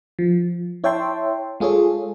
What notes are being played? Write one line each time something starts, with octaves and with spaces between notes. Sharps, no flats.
F3
E4 C#5 E5 G5 A5 C6
G#3 F4 G#4 A4 C#5